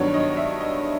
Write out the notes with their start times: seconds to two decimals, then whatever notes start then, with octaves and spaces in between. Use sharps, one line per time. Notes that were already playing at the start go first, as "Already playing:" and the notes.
Already playing: G2 D#3 F#3 B3 D4 C#5
0.14 D#5
0.37 E5
0.60 D#5